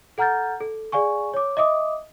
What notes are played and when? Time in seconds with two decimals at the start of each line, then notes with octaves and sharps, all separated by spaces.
0.18 A4 F#5 A#5 F6 G6 A6
0.61 A4
0.92 G#4 D5 F5 G#5 C#6
1.34 C#5 D6
1.57 D#5 E5 D6 D#6